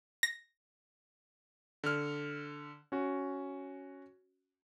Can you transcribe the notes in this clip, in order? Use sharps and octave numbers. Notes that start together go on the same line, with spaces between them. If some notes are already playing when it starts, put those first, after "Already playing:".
A#6
D3 F6
C#4 F#4